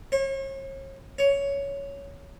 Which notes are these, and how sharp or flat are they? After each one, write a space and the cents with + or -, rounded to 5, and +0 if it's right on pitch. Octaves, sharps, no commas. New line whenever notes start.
C#5 -40
C#5 +10